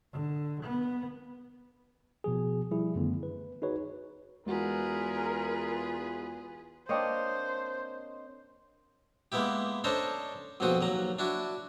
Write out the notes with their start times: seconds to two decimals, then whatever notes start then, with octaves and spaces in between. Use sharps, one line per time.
0.12 D3
0.63 B3
2.24 B2 F3 G#4
2.71 F3 G3 E4 G#4
2.95 F#2 D3 D#3 A3 B3
3.23 B4
3.62 D#4 F#4 G#4 B4 C#5
4.46 E2 G#3 F4 F#4 G#4 A#4 B4
6.89 A#3 C4 D4 C5 C#5 D#5 D#6
9.32 G#3 A#3 B3 E4 G4
9.84 C#4 D4 A4 C5 D#5 A#5
10.60 A#1 F2 B2 C4 F#4 D#6
10.81 D#2 F#3 A#5
11.19 D4 E4 F#4